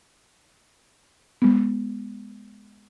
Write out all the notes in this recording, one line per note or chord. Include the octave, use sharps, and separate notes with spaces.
G#3 B3